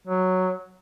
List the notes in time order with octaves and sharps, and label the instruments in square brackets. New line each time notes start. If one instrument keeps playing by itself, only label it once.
[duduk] F#3